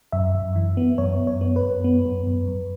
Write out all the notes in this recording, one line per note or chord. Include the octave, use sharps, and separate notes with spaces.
F#2 E5
F#2
E3
B3
F#2 C#5
F#2
C#5
B3
B4
F#2
B3
F#2
F#2
F#2